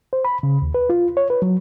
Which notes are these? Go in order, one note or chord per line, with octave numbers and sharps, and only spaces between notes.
C5
B5
C#3
D#2
B4
F4
C#5
B4
F#3